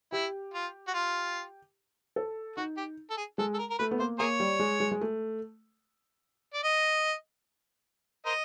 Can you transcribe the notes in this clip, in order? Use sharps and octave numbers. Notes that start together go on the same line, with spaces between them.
E4 G4
F4
F#4
F4
A4
D#4 F#4
G4
A4
G#4
G#3 A4
A4
A#4
A#4
A3 B4
B3
A#3 C5
A#3 G#4 A#4 C#5
G3
G#3
G#3
G#3
A3
D5
D#5
A#4 C5 D#5